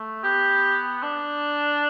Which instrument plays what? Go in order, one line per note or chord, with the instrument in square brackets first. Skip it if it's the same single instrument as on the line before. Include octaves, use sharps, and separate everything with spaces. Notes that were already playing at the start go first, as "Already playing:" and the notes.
Already playing: [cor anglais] A3
[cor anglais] B3 [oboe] G4
[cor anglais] D4